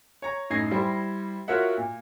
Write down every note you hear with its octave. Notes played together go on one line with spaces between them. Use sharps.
C#5 A#5
F#2 A2 D#4 G#6 A#6 C7
G3 E4 C5
F4 F#4 A#4 C#5 E5 F#5
A#2